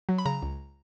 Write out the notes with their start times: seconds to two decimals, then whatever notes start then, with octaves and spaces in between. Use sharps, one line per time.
0.09 F#3
0.18 B5
0.26 C#3 A#5
0.42 C#2